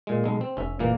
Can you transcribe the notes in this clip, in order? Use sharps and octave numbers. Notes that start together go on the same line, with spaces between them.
A#2 G#3
B1 G#3
C4
F1 C#4 E5
A#2 E3 A#3